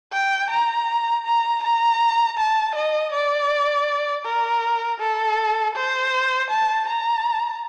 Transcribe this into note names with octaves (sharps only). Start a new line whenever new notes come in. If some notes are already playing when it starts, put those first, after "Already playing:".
G5
A#5
A#5
A#5
A5
D#5
D5
A#4
A4
C5
A5
A#5